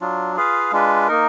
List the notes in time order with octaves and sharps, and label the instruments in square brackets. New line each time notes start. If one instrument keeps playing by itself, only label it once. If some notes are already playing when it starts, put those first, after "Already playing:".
[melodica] F#3 D4 F4
F4 G#4 B4 F5
G#3 D4 F4 B4
A#3 D#4 A#4